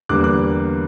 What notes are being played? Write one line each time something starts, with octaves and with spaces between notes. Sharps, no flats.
E2 D3 G3 A#3 D6 F#6
D6 F#6